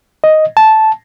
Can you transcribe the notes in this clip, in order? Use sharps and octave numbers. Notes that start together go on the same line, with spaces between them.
D#5
A5